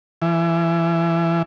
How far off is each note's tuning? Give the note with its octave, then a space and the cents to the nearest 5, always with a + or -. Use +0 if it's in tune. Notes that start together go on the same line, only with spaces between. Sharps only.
E3 +25